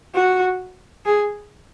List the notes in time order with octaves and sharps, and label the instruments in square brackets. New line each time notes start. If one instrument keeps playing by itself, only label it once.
[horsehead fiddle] F#4
G#4